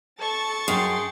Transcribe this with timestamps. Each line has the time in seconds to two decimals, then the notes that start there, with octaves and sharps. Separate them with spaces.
0.20 A4 A5 C#6 A6
0.68 F#2 G#4 G5 C6